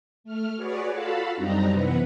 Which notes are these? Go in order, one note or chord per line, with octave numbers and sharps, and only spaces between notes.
A3 F6
F#4 G#4 B4 C#5 D5
F4 F#4 A4 F5 A5 B5
F#2 G3 C4 D4 D#4 A#5
F#2 C3 E3 B3 B4 F#5